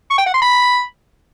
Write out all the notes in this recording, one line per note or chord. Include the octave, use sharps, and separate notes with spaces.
C#6
G5
F#5
C6
B5